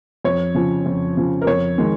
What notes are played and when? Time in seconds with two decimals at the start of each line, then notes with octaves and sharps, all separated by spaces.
0.25 F2 C#5
0.54 C#3 F3
0.86 F2
1.17 C#3 F3
1.42 A#4
1.47 F2 C#5
1.78 D#3 G#3